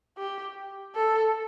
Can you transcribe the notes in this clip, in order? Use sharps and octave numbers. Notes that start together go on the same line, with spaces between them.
G4
A4